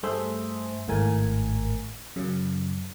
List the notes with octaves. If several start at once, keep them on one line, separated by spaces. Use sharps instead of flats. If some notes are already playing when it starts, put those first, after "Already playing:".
G2 A3 G#4 C5 E5
G#1 A2 A3 A#4 G#5
F#2 C#3